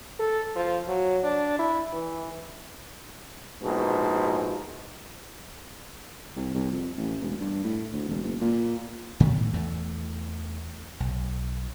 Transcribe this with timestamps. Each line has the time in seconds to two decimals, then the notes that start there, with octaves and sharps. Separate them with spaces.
0.20 A4
0.56 F3
0.88 F#3
1.24 D4
1.59 E4
1.93 E3
3.62 A#1 G#2 B2
6.36 C2
6.54 C2
6.72 F2
6.98 A1
7.21 E1
7.40 G2
7.64 A2
7.93 D2
8.08 E1
8.23 F#1
8.41 A#2
9.20 A2 D#3 A3 B3
9.54 E2 E3 A3
11.00 B1